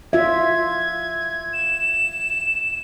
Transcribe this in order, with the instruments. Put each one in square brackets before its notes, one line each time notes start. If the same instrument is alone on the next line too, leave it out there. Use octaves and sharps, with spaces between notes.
[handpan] F4 E5 [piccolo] G#6
[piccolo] E7